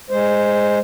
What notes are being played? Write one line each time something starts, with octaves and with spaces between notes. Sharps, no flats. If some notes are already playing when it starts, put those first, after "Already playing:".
G#3 C5